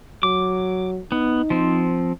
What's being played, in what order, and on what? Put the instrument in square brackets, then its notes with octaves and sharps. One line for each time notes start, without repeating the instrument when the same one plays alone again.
[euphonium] F#3 [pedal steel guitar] D6
[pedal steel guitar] B3 [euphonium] D#4
[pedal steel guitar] F3 C4